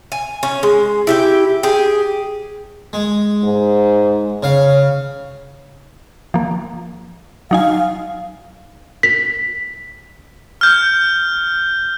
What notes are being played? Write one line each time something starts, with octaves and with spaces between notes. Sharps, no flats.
G#5
C#4
G#3
E4 G4 G5
G4 G#4
G#3
G#2
C#3 C#5 F5
F3 A#3
F#3 D#4 F5 G#5
B6
F6 G6